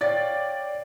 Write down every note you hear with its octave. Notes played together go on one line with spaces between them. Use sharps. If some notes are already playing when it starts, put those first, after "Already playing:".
C#5 D5 F5 G5 A6